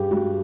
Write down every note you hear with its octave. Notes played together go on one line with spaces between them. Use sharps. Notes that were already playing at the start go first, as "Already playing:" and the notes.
Already playing: G2 G4 G#4
G2 F#4